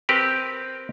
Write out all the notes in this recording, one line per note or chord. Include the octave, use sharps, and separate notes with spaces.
C4 G4 A#4 B4